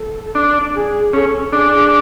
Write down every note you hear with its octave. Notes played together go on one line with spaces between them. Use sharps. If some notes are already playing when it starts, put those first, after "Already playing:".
Already playing: A4
D4
G#4
C#4 A4
D4 G#4